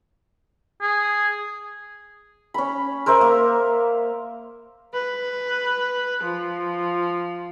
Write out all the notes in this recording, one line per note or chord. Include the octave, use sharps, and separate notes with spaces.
G#4
C#4 B5
A#4 C5 E5 C#6
A#3
B4
F3